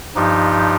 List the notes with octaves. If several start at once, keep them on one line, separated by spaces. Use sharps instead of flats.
G2 F3 D#4 G4